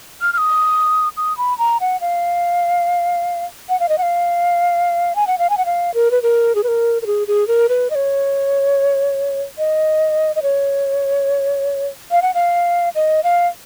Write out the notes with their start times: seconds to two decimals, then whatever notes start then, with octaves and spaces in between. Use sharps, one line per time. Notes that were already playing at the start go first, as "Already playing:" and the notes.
0.21 F6
0.33 F6
0.38 D#6
1.17 D#6
1.38 B5
1.58 A#5
1.81 F#5
2.01 F5
3.69 F#5
3.80 F5
3.89 D#5
3.98 F#5
4.02 F5
5.15 G#5
5.27 F#5
5.38 F5
5.50 G#5
5.57 F#5
5.66 F5
5.94 A#4
6.11 B4
6.23 A#4
6.55 G#4
6.64 B4
6.68 A#4
7.02 A#4
7.07 G#4
7.28 G#4
7.48 A#4
7.69 B4
7.90 D#5
7.95 C#5
9.58 D#5
10.36 D#5
10.43 C#5
12.11 F5
12.22 F#5
12.34 F5
12.95 D#5
13.24 F5